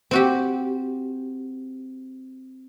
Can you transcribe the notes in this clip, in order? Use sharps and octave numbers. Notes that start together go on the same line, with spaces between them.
C4 F#4 G4